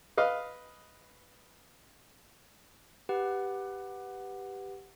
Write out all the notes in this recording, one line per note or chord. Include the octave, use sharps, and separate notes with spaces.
B4 D#5 F5
G4 B4 F#5